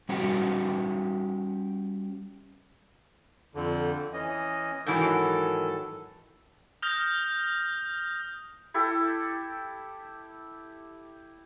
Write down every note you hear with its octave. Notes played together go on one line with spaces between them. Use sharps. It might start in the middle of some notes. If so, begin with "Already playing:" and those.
G3 C#4 F#4 G4 C5 F#5
F2 D3
E3 C#4 D#5
G#2 D#3 E3 F#3 A4
D#6 F6 G6 A#6 F7
E4 G4 A4